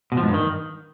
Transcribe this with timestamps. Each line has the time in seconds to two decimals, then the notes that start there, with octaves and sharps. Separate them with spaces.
0.12 B2
0.17 F3
0.23 G#2
0.28 G2
0.34 D#3